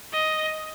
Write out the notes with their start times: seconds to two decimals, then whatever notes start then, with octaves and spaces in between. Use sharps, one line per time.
0.13 D#5